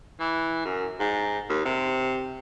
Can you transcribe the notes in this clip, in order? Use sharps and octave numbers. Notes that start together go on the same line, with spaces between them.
E3
F#2
G#2
D#2
C3